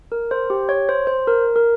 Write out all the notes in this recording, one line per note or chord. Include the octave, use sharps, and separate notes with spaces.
A#4
C5
G4
C#5
C5
C5
A#4
A#4